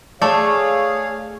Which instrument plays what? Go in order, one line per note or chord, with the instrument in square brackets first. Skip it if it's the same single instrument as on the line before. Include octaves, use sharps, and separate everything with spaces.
[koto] A3 [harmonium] G#4 C#5 F5 [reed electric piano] D5 A5